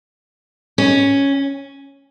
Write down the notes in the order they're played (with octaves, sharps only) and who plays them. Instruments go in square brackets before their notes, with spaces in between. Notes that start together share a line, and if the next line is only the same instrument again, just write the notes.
[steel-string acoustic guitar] C#4